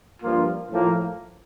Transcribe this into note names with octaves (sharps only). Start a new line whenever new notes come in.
G2 F3 A#3 F4
A2 F3 A#3